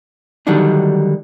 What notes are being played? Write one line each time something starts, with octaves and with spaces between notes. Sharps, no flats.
D3 D#3 F#3 G3 D4 D#4